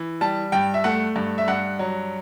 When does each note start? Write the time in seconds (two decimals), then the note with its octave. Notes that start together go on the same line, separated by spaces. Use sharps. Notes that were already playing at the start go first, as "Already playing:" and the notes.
Already playing: E3
0.21 G3 A5
0.52 G2 G5
0.74 E5
0.84 A3 F#5
1.16 G2
1.38 E5
1.48 G2 F#5
1.79 F#3